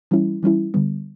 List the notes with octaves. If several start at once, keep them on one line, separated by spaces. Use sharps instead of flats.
E3 G3 C#4 E4
E3 G3 C#4 E4
D3 G3 B3